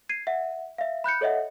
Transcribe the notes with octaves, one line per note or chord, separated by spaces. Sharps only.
G#6 C7 D#7
E5 F#5
E5 F5
B5 F#6 G6 C#7
A4 C#5 D#5 E5 F#5